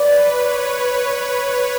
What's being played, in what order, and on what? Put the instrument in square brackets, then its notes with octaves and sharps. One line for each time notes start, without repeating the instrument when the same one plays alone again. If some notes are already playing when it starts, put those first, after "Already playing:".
Already playing: [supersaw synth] B4 [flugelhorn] D5
[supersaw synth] C#5